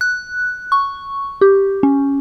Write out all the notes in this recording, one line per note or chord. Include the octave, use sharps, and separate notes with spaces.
F#6
C#6
G4
C#4